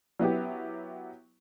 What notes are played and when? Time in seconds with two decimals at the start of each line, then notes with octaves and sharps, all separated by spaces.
0.19 F#3 B3 E4 G4